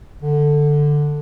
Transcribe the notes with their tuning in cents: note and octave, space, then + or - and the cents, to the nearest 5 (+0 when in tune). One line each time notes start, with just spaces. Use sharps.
D3 +5